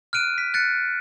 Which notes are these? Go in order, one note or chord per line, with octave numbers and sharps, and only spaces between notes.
F6 F#6 D7 D#7
B6
F#6 A6 C#7